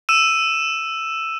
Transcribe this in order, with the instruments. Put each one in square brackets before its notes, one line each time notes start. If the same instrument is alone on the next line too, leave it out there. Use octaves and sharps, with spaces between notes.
[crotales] E6 D#7 E7